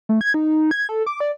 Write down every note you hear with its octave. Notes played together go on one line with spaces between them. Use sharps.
A3
G#6
D#4
G#6
A4
D6
D5